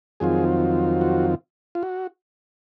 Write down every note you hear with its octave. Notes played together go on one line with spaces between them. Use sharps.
F2 D#3 F#3 C4 F4 G#4
F#4
F4
F#4